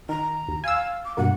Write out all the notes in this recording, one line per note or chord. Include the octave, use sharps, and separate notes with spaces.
D#3 A#5
D#2
F5 G#5 E6
D6
G2 B2 A#3 F#5